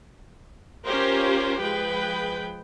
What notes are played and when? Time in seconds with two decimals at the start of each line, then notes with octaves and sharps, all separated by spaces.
0.86 C#4 F4 G4 A#4 C5
1.60 F3 G#3 B4 G5